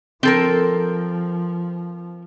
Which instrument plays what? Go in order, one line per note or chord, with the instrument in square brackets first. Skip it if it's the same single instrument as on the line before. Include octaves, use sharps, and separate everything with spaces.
[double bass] F3 [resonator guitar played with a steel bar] C4 A4 A#4